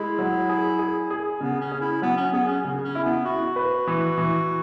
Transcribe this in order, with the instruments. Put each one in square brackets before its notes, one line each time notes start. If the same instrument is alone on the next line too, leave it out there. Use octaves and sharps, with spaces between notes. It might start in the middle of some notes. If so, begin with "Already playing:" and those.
Already playing: [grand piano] G#3 [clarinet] E4
[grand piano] F#3
G#4
G#4
G#4
[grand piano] C#3 [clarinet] B3
[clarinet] C#4
[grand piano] G#4
[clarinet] E4
[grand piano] F#3 [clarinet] B3
[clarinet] C#4
[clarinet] B3 [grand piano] G#4
[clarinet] C#4
[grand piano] C#3
[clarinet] C#4
[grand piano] E4
[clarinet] B3
[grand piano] E4 [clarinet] F#4
[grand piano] B4
E3
E3